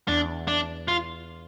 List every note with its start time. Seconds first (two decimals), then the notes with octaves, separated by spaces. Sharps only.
0.08 E2 D4
0.48 D4
0.88 F4